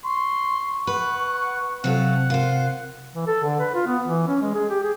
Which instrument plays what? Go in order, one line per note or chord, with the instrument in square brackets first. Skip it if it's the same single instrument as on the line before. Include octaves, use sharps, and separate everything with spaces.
[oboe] C6 [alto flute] C#6
[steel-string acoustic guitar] B4 [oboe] F#5
[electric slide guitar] C3 [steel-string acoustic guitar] F#3 F4 A4 [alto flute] C5 [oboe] F#5
[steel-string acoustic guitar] F4 C5 [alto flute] A#4
[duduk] E3
A4
D3
B4
F4
B3
E3
C#4
G#3
G#4
G4
G#4